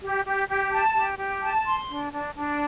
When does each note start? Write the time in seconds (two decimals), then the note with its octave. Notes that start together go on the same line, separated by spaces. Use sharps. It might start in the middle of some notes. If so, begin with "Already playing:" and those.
0.02 G4
0.26 G4
0.49 G4
0.72 A5
0.95 G4
1.18 G4
1.42 A5
1.66 C6
1.88 D4
2.12 D4
2.35 D4